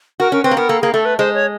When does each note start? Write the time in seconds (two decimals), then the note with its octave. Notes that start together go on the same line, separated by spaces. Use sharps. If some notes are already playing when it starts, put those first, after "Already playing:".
0.20 F#4 A#4
0.32 C#4 A#4
0.44 C4 B4
0.51 A#3
0.57 B3 A#4
0.69 A#3 A4
0.81 A#3 G#4
0.94 A3 A4
1.05 B4
1.18 G#3 C5
1.34 C#5